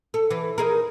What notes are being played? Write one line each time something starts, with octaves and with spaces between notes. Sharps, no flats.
A4
E3
D#4 G#4 A#4